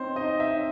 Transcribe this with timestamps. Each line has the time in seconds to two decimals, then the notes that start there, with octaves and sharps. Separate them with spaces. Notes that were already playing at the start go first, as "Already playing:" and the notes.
Already playing: C4 D#4 C5 C#5
0.15 D#4 D#5
0.40 E5
0.50 D#4